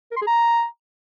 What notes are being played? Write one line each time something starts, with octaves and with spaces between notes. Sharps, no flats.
A#4
C6
G#4
A#5